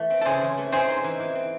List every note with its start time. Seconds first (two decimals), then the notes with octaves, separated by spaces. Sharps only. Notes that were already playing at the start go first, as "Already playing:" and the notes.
Already playing: E3 A3
0.10 C4
0.21 A4
0.25 C#3 G#4 C5
0.41 E3
0.58 A3
0.72 C4 G#4 C5
0.88 D#4
1.04 E3
1.20 E3
1.35 C4